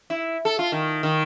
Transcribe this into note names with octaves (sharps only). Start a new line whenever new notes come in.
E4
A4
F4
D#3
D#3